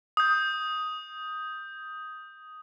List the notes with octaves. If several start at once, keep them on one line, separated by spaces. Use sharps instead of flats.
D#6 G6